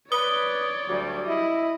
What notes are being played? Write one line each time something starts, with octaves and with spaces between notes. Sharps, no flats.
B4 C#5 D5 D#6 G7
D2 F#3 G3
E4 D#5